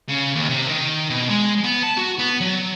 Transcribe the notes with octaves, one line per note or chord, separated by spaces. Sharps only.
C#3
D#2
C3
D#3
B2
G#3
B3
A5
F#4
B3
F#3